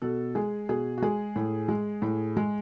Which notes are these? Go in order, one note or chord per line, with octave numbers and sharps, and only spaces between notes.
B2 A4
G#3 G#4
B2 G#4
F#4
G#3 G#4
A2
G#3
A2
G#3